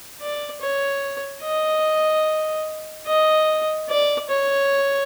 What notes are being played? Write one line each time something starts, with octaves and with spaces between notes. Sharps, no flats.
D5
C#5
D#5
D#5
D5
C#5